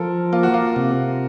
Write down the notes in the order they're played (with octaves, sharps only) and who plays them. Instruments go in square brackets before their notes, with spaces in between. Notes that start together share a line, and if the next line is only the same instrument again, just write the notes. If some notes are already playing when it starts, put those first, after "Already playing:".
Already playing: [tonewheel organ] F3 [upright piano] A4 A#4
[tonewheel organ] A#3 [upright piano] F4
[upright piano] F#4
F4
[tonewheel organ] C3